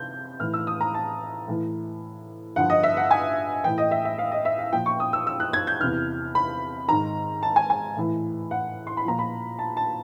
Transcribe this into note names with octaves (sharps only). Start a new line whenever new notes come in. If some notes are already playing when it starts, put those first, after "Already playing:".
Already playing: C3 G6
A2 E3 F6
E6
D#6
A#5
A5
A2 E3
G2 D3 F3 F#5
D#5
E5
F#5
G#5
A2 E3 G5
D#5
E5
E5
F5
D#5
E5
F5
A#2 F3 G5
C#6
D#6
E6
E6
F#6
G#6
G6
E2 C3 E3 F6
B5
G#2 D#3 A#5
A5
G#5
G#5
A2 E3
F#5
C6
B5
A#2 F3 A#5
B5
A5
A5